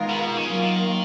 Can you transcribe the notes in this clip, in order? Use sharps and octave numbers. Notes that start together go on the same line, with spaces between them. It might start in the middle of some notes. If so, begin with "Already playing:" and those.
Already playing: D#3 G#3 B3 F4 A#4
B2
D#3
C#3 F#3 A#3 F4
D#3